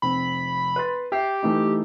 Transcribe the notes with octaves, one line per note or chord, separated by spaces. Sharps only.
F1 C4 B5
B4 C6 A6
G4 E5 C7
E3 A3 D#4